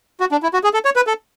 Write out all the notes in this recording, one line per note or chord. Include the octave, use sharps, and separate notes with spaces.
F#4
D4
E4
F#4
G#4
A4
C#5
B4
A4